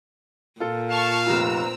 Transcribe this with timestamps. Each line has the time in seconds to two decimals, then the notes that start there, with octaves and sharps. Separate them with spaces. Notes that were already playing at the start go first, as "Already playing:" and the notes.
0.60 A#2 F4 A4
0.91 F5 A5 C#6 F6
1.27 F1 C4 F4 A#5 E6